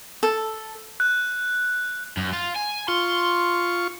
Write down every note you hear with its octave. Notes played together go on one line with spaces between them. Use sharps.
A4
F#6
F#2
F4
G#5
F4 C6 C#6